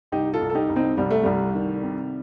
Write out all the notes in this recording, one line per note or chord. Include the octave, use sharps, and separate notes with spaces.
C2 D#4 G4
F4 A4
C2
A4
D#4 G4
C2
C4 D#4
C2 G3
A3
C2 G3
D#3
C3